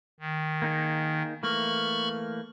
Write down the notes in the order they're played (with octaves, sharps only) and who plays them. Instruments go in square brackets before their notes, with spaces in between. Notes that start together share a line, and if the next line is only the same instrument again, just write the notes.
[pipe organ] D#3
[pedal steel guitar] A#3 D#4 G#4
[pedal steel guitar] E3 A3 A#3 [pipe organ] B5 C#6 F6